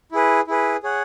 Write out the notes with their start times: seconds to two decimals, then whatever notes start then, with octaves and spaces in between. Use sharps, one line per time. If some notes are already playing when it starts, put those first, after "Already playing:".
0.12 E4 G#4 B4
0.47 E4 G#4 B4
0.83 G#4 C#5 F#5